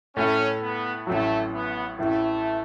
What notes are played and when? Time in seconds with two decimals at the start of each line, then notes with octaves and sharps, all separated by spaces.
0.16 A2 A3 C#4 E4 A4 E5
0.62 B3
1.07 A1 A2 F#3 A3
1.53 B3
1.98 A1 A2 E3 A3